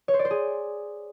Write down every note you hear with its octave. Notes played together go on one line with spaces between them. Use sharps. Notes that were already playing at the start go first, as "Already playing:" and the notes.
C#5
C5
D5
C5
G#4